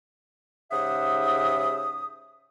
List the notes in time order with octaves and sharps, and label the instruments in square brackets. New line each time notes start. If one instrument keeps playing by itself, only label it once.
[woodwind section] G#2 C#3 G4 E5 F#5 D#6